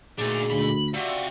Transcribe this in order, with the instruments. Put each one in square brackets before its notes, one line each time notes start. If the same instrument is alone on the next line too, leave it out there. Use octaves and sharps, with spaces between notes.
[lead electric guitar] A#2 [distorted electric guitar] A3 D4 [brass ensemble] D#4 F#4 G#4
[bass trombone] D2 [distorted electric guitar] B5
[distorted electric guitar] C3 [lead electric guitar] F4 F#4 [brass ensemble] D5